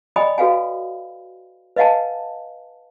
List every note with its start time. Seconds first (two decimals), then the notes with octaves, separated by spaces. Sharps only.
0.16 D5 D#5 G5 G#5 B5 D#6
0.38 F#4 A4 B4 F5 F#5 G#5
1.76 B4 D#5 F5 F#5 G#5 A5